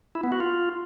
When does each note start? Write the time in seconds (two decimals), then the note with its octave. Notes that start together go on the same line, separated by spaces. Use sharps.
0.15 E4
0.24 B3
0.32 F#4
0.40 F4